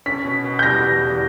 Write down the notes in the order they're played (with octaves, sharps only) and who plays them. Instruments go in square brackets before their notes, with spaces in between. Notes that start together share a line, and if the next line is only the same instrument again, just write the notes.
[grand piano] C#4 [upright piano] B6
[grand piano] B2
B2
[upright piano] G6
[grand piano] G3 [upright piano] A#6
[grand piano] E2
E2